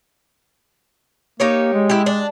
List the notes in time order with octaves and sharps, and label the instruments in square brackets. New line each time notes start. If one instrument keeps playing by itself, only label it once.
[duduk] A#3 [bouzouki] D#4 G4 C#5
[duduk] G#3
[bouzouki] E4 G4
D4